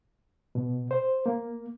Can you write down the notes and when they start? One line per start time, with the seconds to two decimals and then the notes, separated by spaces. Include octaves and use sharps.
0.55 B2
0.91 C5
1.26 A#3